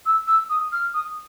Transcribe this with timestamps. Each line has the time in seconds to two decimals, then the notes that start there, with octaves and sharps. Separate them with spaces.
0.06 E6
0.27 E6
0.50 D#6
0.72 F6
0.94 D#6